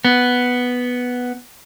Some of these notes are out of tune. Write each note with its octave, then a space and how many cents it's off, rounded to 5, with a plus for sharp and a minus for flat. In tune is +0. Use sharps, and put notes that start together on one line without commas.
B3 +0